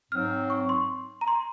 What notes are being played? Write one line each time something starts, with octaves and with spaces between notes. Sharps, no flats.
G#2 F#3 C4 F6
C#6
C6
A#5
C6